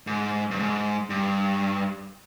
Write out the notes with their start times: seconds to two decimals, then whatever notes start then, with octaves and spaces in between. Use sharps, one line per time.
0.07 G#2
0.51 G2
0.59 G#2
1.10 G2